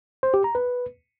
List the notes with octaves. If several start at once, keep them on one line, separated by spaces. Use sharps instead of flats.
C5
G4
A#5
B4